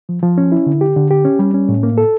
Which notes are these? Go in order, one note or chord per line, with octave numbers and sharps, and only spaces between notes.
F3
F3
C#4
E4
D3
G4
D3
G4
C#4
G3
C#4
A2
A#3
A4